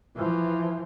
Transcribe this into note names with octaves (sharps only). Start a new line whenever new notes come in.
E3 F3